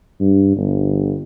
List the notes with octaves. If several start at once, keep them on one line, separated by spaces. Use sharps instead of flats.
G2
G1